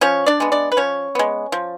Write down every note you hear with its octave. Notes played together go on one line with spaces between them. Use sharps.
F3 C#4 C#5
D4 D5
G#3 B3
D4 D5
B4
F3 C#4 C#5
G#3 B3
F3